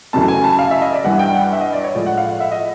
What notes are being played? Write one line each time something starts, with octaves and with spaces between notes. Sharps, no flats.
F#2 C#3 E3 A3 A5
G#5
A5
F5
E5
D#5
D5
G2 E3 G3 F#5
G5
F#5
E5
D#5
D5
C#5
A2 F3 G#3 D5
F#5
F5
F#5
E5
D#5